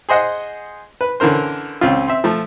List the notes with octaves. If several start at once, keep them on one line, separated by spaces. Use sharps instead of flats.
G#4 C5 D#5 F#5
B4
D3 E3 C#4 A#4 C5
C#2 C4 C#4 F4
C4 E5
F3 A3